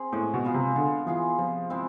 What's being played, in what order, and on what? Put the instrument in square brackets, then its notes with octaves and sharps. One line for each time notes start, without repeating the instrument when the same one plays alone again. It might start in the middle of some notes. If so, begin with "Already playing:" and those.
Already playing: [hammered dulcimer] C4 G#4
[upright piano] A2 [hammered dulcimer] G#3
[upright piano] B2
[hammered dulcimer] B3 F4 G#4
[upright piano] C3
[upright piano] D3 [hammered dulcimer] G#3
[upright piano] E3 [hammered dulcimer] B3 F4 G#4
[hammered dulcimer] C3 [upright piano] F3
[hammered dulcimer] G#3 C4 E4